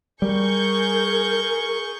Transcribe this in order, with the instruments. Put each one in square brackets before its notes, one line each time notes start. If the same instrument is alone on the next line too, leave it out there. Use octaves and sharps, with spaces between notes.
[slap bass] G3 [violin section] G#4 C#6 G6 [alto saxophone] A#4